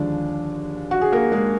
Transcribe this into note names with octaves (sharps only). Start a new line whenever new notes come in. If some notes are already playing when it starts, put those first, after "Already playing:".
Already playing: D#2 D3 F3 G#3 D4 D5
F#4
G#4
A#3 A#4
G#3 G#4